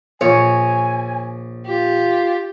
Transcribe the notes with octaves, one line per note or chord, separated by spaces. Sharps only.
A#1 C#5 G#5
F4 G4